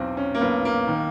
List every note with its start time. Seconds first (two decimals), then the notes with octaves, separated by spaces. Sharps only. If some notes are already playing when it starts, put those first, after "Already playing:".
Already playing: B1 E2 C4
0.17 C#4
0.35 A#3
0.41 B1 B3
0.65 A#3
0.88 D#3